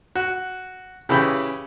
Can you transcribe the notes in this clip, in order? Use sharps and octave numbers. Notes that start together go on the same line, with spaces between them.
F#4
C#3 E3 C#4 G4 B5